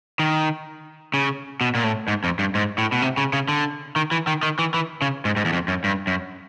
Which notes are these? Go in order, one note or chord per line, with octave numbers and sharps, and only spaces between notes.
D#3
C#3
B2
A#2
A2
G#2
F2
G2
G#2
A2
B2
C3
C#3
C#3
D3
D#3
E3
D#3
D#3
E3
E3
C#3
G#2
G#2
E2
F2
F#2
G2
F#2